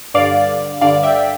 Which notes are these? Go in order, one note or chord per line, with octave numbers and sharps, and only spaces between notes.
G2 D3 D5 F5
G2 D3 D5 F5
E5 G5